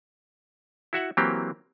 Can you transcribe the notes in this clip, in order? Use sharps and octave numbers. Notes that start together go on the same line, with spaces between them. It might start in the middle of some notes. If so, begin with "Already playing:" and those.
E4 F#4 E5 F#5
E3 F#3 A#3 C4 G4